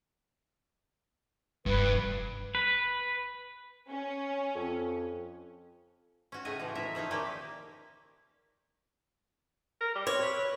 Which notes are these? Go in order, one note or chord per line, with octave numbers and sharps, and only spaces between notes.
F1 G2 B4
B4
C#4
F2
C#4 F#4
A2 C#3 A3 D#5 G#5
E3 F3
E4 A#4 E5 A#5
F3 C#4 D#4 E5
A#2 D#3 A#3 C#4 E4 G4
A#4
G3
C4 C#5
B4